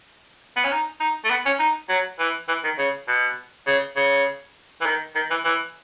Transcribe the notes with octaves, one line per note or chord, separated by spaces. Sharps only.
B3
C#4
D#4
D#4
A3
B3
C#4
D#4
F#3
E3
E3
D#3
C#3
B2
C#3
C#3
E3
D#3
D#3
E3
E3